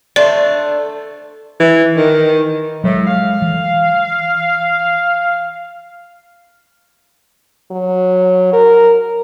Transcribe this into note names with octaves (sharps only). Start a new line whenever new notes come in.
A3 D4 C5 D5
E3
D#3
A2 F#3 G#3
F5
E3
F#3
A#4